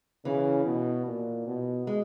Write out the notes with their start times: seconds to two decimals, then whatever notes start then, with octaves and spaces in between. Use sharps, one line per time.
0.25 C#3 E3
0.65 B2
1.06 A#2
1.46 B2
1.87 G#3